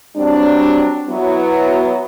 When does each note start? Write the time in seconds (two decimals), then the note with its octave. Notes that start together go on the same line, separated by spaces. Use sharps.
0.16 F#3 G3 C4 D4
1.09 F#3 B3 E4